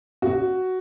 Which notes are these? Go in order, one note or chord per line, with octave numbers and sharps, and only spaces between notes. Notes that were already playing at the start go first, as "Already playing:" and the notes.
F#4